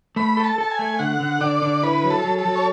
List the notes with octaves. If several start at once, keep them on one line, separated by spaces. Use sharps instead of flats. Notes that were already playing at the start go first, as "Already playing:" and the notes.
A3 B5
A4
A5
A4 A5
G#5
A3
D3 F#5
D3
D3 D5
D3
E4 B4
F#3
A4
F#3
A4
F#3
C#5